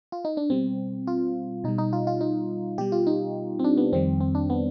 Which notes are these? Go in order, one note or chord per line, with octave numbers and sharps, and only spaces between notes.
F4
D#4
D4
B2 G3 C4
F4
B2 G3 D#4
D#4
F4
F4
D#4
B2 G3 G4
F4
D#4
C4
D4
B3
F2 D#3 G3 C4
C4
D4
B3